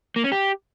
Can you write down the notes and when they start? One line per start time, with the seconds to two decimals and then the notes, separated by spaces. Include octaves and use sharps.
0.16 A#3
0.24 C#4
0.32 G4